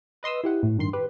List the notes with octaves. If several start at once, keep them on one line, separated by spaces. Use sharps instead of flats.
B4 D#5 C6 D#6 E6
E4 G4 F#5
A2
G2 D#3 C6 C7
G4 B4